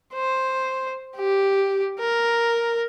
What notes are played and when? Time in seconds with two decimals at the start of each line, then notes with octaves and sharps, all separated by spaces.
0.14 C5
1.17 G4
2.00 A#4